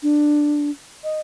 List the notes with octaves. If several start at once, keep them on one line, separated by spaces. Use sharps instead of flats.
D4
D#5